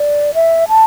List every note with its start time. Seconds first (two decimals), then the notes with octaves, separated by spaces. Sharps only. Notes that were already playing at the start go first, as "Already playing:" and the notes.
Already playing: D5
0.34 E5
0.68 A5